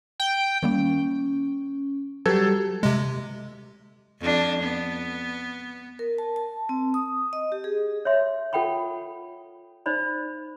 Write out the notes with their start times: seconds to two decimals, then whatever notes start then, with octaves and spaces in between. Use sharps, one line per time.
0.20 G5
0.63 D#3 G3 A#3 C#4
2.26 F#3 G3 G4 A4 B4 G#6
2.83 C3 G#3
4.21 F2 D4
4.63 B3
5.99 A#4
6.18 A5
6.36 A5
6.69 C4
6.94 D#6
7.33 D#5
7.52 G4
7.64 G#4
8.05 C#5 E5 C6
8.53 F4 A4 F#5 G5 B5 C#6
9.86 D#4 C5 D5 B5